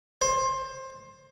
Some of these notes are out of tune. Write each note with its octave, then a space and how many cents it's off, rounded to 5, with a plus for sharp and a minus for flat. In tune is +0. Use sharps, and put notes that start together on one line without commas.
C5 +20